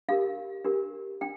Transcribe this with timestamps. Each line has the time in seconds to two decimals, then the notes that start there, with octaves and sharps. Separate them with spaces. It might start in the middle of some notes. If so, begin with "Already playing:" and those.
0.09 D4 G4 A#4 F5
0.64 D4 G4 A#4
1.21 D4 G5